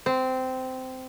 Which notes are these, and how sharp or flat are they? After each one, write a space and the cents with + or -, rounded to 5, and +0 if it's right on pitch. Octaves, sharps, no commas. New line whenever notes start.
C4 -15